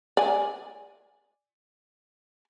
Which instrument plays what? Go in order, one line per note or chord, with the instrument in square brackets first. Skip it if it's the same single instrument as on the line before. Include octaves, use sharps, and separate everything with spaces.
[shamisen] D5 G#5